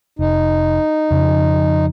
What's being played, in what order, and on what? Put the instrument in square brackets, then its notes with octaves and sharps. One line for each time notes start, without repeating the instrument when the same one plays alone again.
[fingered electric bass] F1 [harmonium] D#4
[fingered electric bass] F2 C#3 F3